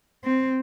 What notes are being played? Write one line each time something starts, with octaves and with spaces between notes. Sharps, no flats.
C4